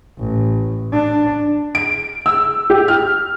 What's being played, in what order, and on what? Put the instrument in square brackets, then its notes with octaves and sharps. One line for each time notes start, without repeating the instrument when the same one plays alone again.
[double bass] A1
D4
[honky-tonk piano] D7
E6
G4
F6